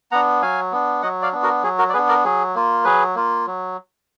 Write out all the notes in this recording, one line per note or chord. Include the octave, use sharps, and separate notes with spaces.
B3 D4 F#5 A#5
F#3 F5 G#5
B3 D4
F#3 D#5 F#5
D5 F5
B3 D4
F#4 A#4
F#3 G#4
F#4 A#4
D5
B3 D4 G#4 B4
A#4 D5
F#3 G#4
A#3 F4
F#3 G#4 B4
A#3 F4
F#3